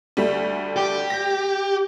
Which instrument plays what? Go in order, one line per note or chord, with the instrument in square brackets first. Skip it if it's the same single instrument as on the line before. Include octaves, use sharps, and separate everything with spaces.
[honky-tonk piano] D2 G3 A3
[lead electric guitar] G4
[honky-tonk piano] G6 A#6